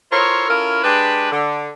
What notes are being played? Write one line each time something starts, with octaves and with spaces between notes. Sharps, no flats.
E4 F4 A4 A#4 C5 C#5
C#4 E4 F4 A4 A#4
G#3 D4 G4 B4
D3